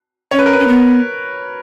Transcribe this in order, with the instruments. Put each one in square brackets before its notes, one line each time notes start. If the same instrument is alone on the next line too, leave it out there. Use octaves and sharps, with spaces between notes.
[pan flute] C#4 [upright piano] C#5
[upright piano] B4
A#4
B4
[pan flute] C#4
B3